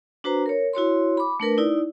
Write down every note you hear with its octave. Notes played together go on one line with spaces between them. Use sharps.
D4 F#4 B4 C5 A#5
A#4 C#5
E4 F#4 C#5 C6
B5 D6
A3 D4 A#4 B4
D#4 E4 D5